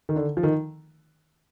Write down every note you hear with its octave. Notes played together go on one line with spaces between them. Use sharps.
D#3
D3
F3
D#3